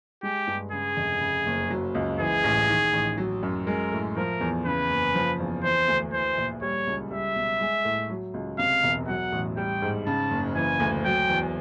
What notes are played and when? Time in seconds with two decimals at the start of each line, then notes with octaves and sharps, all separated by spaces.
0.23 G#3 G4
0.47 G2
0.72 C#3 G#4
0.97 F1
1.21 C#3
1.46 F#1
1.70 F#3
1.95 C#2
2.19 E3 G#4
2.44 A1
2.69 D#3
2.93 A1
3.18 F#3
3.43 F#2
3.67 G#3 A#4
3.92 A2
4.17 F3 A#4
4.41 E2
4.65 C#3 B4
4.90 F#1
5.15 F3
5.39 E2
5.64 E3 C5
5.88 D2
6.13 E3 C5
6.38 A#1
6.62 G3 C#5
6.87 C#2
7.11 G3 E5
7.36 B1
7.60 G#3
7.85 A2
8.10 F#3
8.34 C#2
8.59 C3 F5
8.83 E1
9.08 F#3 F#5
9.32 A1
9.57 G3 G5
9.82 G#2
10.06 C#3 A5
10.31 F#1
10.56 E3 G#5
10.80 D2
11.05 F#3 G5
11.29 E2